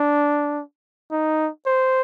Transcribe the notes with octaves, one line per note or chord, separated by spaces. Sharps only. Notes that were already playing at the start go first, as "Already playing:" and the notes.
Already playing: D4
D#4
C5